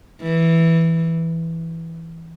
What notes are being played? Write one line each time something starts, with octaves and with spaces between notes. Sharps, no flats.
E3